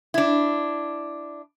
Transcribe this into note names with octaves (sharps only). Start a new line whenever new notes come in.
D4 E4